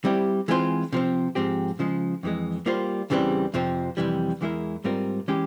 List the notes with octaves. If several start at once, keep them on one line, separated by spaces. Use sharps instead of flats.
G3 C4 E4 G4
E3 G#3 C4 F4 C5
C3 F3 C4
G#2 F3 C4 G4
C#3 F3 G#3
F2 E3 G#3
G3 A#3 F4 C5
E2 C#3 E3 G3 C4
F2 C3 F3 C4
F2 C3 E3 G3
E2 E3 G#3 E4 A#4
G#2 G3 C4 F4 A#4
E3 G#3 C#4 G4